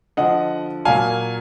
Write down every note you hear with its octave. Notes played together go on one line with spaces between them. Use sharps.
D3 F3 D#5 F#5
A#2 F#3 F5 G#5